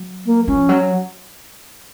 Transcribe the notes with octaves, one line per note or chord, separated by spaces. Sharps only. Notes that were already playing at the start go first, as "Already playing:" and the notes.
Already playing: F#3
A#3
F3 C#4
F#3